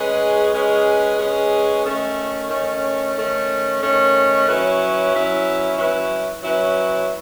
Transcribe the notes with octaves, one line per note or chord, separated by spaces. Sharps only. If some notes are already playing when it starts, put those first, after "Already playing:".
Already playing: G#3 C#4 G#4 B4
G#3 C#4 G#4 B4
G#3 C#4 G#4 B4
D#3 A3 C#4
D#3 A3 C#4
D#3 A3 C#4
D#3 A3 C#4
F#3 C#4 E4 B4
F#3 C#4 E4 B4
F#3 C#4 E4 B4
F#3 C#4 E4 B4